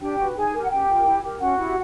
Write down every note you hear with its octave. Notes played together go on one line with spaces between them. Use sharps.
D4 G4 G5
F#4 B4
D#4 G#4 G#5
G4 A#4
F#5
C#4 G4 G5
F4 A#4
E4
G4 A#4
C#4 F#4 F#5
E4 G4